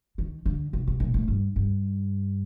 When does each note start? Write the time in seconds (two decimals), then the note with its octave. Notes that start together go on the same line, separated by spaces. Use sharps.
0.18 D#3
0.46 D3
0.73 C3
0.88 C3
1.00 A#2
1.14 A2
1.28 G2
1.56 G2